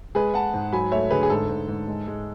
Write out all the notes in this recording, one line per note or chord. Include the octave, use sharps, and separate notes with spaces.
G#3 G#4 B4
G#3 F#5 A5
G#2
F#3 G#5 B5
A3 C#5 E5
D3 G#4 B4
G#4
G#2 A4
G#2
G#2
G#3
G#3